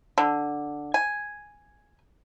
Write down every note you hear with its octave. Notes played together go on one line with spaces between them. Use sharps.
D3
G#5